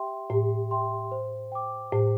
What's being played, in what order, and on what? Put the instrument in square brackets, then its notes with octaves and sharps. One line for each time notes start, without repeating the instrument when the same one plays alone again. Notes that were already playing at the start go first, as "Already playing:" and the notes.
Already playing: [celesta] G4 E5 G5 C6
[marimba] A2 [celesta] G4
[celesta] E5 G5 C6
C5
G5 D6
[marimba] A2 [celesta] C5